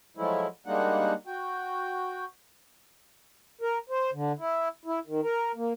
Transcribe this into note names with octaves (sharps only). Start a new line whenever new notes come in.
F3 F#3 G#3 A3 E4
G3 G#3 A#3 D4 D#4 F#5
F#4 G5
A#4
C5
D3
E4
E4
D#3
A#4
A#3